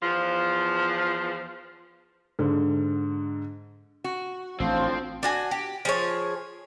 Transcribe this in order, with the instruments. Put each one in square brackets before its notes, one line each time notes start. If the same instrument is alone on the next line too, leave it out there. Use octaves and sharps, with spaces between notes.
[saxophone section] E2 F3
[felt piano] G#2 D3
[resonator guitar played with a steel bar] F#4
[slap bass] A1 [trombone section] D2 A2 F3 [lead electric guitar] C4
[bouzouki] D4 F#4 G#5
G4
F3 G#4 C#5